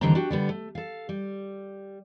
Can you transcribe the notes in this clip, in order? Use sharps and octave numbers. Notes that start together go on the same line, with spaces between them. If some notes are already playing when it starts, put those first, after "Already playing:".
D#2 D3 E3 G3 C4 A#5
D4 F#4 G4
D3 G3 B3
A3
A4 F5
G3